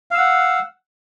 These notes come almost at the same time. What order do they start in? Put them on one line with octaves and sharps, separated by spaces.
F5 E6 F#5